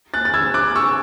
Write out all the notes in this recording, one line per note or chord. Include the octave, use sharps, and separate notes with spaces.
F#6 A6
A6
E6 G#6
D6 F#6
C#6 E6